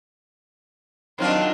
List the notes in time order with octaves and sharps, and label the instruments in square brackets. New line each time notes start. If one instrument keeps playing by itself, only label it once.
[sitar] D#3 F#3 F4 [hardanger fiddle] C4 D4